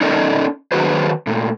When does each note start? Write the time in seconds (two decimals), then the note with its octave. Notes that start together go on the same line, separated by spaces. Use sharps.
0.01 C#4 D#4 A4 A#4 D5 D#5
0.72 D#3 F#3 F#4 G#4 B4 C5
1.27 A#2 A3